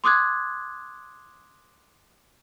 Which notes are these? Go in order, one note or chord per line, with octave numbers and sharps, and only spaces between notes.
C6 D6 D#6 F#6 G#6